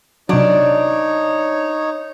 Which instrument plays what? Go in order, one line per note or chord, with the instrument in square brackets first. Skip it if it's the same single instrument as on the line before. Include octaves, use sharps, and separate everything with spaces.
[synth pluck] C3 F#3 [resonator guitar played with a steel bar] D4 [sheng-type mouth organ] D#4 C#5